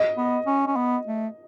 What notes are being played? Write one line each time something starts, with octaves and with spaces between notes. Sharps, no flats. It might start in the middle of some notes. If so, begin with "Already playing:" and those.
Already playing: D#5
B3
C#4
C#4
B3
A3